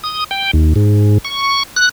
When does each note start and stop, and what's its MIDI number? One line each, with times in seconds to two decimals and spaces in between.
0.04 0.24 87
0.31 0.51 79
0.53 0.73 39
0.76 1.18 44
1.25 1.63 85
1.76 1.89 90